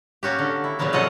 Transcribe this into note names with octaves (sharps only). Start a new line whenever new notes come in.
A#3 C#4 F#4 G4
D3
E4
A#2 C#3 F3 F#3 A#3 B3
C3 F#3 F4 A4 D#5 F#5